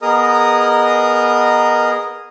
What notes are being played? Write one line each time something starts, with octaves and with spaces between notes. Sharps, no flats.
B3 G#4 A#4 D#5 A#5 D#6